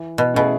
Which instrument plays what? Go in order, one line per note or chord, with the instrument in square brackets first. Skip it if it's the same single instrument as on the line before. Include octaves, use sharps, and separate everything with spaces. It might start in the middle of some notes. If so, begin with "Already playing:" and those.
Already playing: [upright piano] E3
[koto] B2
[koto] B2 [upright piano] A3 C#4 E4 G#4